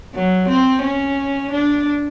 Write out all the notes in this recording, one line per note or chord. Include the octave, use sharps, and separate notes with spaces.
F#3
C4
C#4
D4